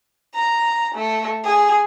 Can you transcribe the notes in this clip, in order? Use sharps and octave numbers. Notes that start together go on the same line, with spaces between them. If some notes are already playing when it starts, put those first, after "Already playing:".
A#5
A3
G#4